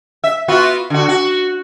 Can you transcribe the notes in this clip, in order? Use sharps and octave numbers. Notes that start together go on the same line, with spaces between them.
E5
B3 F4 F#4
D3 F#4
F#4